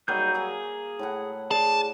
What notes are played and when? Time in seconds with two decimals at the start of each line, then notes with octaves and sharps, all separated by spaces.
0.08 F#3 G3 A#3 D#4 G#4 G6
0.34 G#4 F5 G#5
0.99 A2 E4 F#5
1.51 G#4 D5 A5